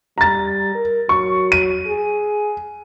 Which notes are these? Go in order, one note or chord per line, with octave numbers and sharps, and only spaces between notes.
G3 A#5 A6
A#4
F#3 C#6
D#7
G#4